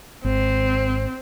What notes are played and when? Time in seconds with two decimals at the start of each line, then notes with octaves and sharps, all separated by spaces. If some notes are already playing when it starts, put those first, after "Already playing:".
0.24 G#1 C4